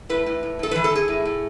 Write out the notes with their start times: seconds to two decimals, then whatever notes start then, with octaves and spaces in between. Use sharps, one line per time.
0.09 A2 B4
0.26 A2
0.43 A2
0.59 A2 A4
0.71 E3 B4
0.84 A4
0.91 E3 G#4
1.08 A2
1.25 A2